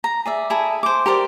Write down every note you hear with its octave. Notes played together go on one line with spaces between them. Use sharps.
A#5
G#4 D5 E5
E4 G#4 A4
C5 D6
G4 A#4 C5 D5